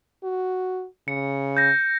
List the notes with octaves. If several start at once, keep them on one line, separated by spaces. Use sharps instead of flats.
F#4
C#3 C#7
G6 A#6